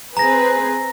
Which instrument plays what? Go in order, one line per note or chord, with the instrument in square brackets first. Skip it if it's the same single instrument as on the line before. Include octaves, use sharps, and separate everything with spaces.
[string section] C4 G#4 B4 [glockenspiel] A#5 A#6